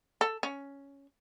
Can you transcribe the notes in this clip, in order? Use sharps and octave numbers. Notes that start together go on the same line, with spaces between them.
A4
C#4